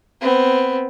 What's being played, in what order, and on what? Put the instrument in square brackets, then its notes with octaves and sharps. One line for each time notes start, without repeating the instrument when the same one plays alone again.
[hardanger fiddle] B3 C4